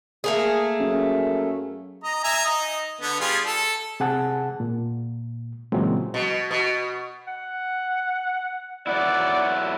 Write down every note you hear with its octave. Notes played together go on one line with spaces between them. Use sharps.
A3 A#3 G#4
F#2
D#5 A#5
E5 G#5 A#5
D#4 D#5
D3 B3
G3 F4 G#4
A4
C3 G#4 F#5 A5
A#2
A#2 C#3 E3 F#3 G#3 C4
B2
B2
F#5
F#3 B3 E4 D5 F#5